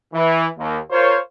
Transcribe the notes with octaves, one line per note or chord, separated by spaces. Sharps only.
E3
D#2
F4 A#4 C5 C#5